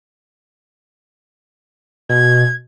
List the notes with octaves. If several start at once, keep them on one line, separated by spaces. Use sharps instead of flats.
B2 G#6